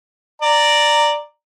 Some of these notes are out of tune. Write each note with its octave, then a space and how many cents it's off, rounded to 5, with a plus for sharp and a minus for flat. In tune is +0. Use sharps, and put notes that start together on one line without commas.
D5 +0 A#5 -10